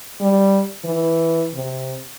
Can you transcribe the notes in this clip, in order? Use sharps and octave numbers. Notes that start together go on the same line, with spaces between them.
G3
E3
C3